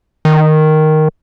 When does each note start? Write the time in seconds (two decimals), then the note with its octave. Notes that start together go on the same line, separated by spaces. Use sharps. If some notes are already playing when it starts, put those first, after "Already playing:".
0.25 D#3